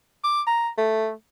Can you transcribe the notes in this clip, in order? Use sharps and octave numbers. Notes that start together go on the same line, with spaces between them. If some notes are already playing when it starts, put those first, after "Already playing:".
D6
A#5
A3